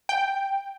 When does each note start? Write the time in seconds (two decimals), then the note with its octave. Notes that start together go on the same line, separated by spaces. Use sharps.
0.09 G5